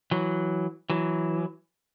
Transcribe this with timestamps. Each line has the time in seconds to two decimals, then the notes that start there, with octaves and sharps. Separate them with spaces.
0.11 E3 F#3
0.90 E3 F#3